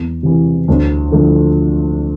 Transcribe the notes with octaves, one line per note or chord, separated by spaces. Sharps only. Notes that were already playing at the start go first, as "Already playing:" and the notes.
Already playing: E2
C3 E3
D2
D3 F3 A3